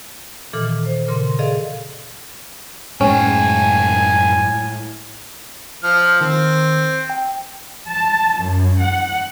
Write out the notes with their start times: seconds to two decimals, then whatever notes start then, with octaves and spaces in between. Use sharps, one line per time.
0.53 A#2 D#3 E3 A4 D6 F6
0.86 C5
1.08 A#2 C#3 A#4 C6
1.39 G#4 A4 D5 D#5 F5
3.01 F#2 A2 G#3 C#4 G5 G#5
5.84 F3 F6
6.21 D#3 C4
7.10 G5
7.88 A5
8.37 F#2
8.81 F#5